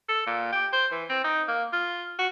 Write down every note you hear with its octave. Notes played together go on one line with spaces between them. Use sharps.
A4
A#2
G4
C5
E3
C4
D#4
A#3
F4
F#4